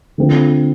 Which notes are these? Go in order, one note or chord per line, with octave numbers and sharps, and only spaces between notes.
D3 A3 C4 F4